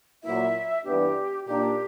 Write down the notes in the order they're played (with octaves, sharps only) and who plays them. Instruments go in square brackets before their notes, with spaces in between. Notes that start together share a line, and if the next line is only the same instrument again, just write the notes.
[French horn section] A#2 F#3 A#3 E4 [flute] E5
[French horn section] G2 E3 B3 D4 [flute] G4
[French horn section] A#2 A#3 D4 [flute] G4